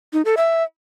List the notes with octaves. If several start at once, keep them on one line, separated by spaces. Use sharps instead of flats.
D#4
A4
E5